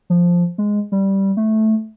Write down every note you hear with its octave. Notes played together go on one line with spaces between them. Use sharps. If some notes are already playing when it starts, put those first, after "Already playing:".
F3
G#3
G3
A3